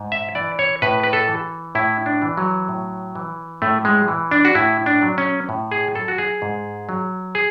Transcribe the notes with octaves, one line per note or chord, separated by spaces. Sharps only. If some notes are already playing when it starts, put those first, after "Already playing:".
Already playing: G#2
E5
E3 D5
C#5
A2 B4
B4
A4
E3
A2 E4
D4
E3
F#3
A2
E3
A2 A3
G#3
E3
D4
F#4
A2 E4
D4
F#3
C#4
A2
G#4
F#3 A4
F#4
G#4
G#2
F#3
G#4